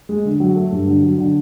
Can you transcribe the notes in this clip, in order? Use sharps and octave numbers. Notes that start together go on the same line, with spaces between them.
G#3
D3
F#3
A3
G2
D3
F#3
D3